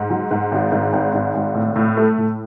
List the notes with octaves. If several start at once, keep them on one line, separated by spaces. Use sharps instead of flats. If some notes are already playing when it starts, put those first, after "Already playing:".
Already playing: G#2
F#3
G#2
G#1
G#2
G#1
G#2
G#1
A2
A2
A3
A2